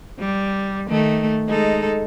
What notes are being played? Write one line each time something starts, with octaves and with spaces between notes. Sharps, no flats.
G3
D#3 A3
G#3 D#4 A4